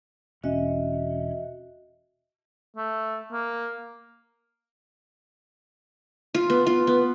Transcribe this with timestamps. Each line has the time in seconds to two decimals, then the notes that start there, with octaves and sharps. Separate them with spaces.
0.44 E1 C#4 F#4 D#5 E5
2.76 A3
3.32 A#3
6.35 F4
6.50 B3
6.67 F4
6.87 B3